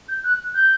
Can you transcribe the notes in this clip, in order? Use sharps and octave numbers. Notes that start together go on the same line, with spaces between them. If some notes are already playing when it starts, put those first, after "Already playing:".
G6
F#6
G6